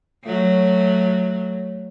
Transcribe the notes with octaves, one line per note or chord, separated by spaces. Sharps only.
F#3 A3